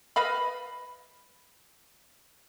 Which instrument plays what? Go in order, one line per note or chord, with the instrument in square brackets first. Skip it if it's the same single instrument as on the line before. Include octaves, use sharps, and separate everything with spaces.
[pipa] B4 D#5 F5 B5